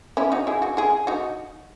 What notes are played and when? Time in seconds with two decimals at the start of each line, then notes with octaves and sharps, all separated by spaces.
0.17 C#4 E4
0.32 D#4 F#4
0.47 E4 G#4
0.62 D#4 F#4
0.77 E4 G#4
1.07 D#4 F#4